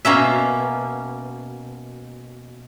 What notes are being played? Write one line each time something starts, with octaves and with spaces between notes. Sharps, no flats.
B2 A#3 C#4 E5